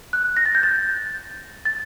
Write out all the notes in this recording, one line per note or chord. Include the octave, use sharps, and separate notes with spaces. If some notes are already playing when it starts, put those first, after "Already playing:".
F#6
A#6
A6
G6
A6
A6